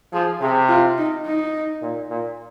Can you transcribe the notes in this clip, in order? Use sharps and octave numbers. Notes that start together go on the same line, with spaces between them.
F3 G#4
C3 G#4
F4
D#4
D#4
A#2
A#2